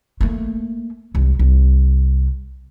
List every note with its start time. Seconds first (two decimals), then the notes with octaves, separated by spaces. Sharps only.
0.21 A3 A#3
1.15 C2 G#3
1.39 C2